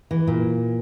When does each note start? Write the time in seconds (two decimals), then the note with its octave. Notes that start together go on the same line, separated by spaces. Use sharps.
0.11 E3
0.27 A#2